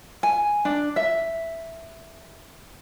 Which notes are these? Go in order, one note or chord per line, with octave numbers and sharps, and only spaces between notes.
G#5
D4
E5